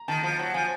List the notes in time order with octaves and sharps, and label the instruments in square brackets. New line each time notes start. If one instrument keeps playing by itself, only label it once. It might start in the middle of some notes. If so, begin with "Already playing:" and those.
Already playing: [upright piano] A#5
[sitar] D#3 [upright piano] A5
[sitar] F3
F#3
[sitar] F3 [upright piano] G#5